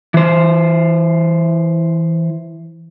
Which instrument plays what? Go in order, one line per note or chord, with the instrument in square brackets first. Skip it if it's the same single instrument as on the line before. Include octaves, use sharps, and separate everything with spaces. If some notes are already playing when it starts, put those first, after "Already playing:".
[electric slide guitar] E3 C5